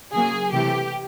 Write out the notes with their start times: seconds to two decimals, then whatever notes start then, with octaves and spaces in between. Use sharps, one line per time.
0.13 C#3 F#3 A#3 G#4
0.53 C3 E3 A3 G4